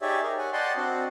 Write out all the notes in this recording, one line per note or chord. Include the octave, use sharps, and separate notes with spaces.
D#4 G4 G#4 C#5 D5 E5
G#4 A#4
C#5 F#5 G#5
D5 D#5 F#5 G5 A5 C6
C4 D4 F#4